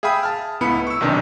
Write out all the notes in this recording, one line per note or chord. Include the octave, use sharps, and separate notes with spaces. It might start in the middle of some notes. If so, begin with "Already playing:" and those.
G#4 E5 F5 G5 B5 D#6
A5 F6
C#2 A2 B3 E4 B5 C#7
C#6 E6
B1 C3 D#3 D4 D#4